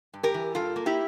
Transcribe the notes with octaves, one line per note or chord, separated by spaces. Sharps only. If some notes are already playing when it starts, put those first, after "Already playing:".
G2
G4 A#4
E3
G2 F4 A4
A#3
E4 G4